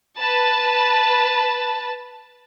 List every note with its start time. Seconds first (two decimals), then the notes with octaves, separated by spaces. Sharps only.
0.19 B4 A5